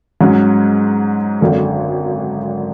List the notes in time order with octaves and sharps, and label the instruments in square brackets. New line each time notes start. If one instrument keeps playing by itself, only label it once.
[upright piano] G#2 F#3 C#4
G#1 F#2 D3